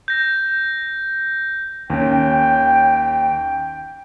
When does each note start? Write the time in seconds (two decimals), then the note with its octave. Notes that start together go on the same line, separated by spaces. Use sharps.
0.08 G6 A#6
1.90 D#2 C#4 G5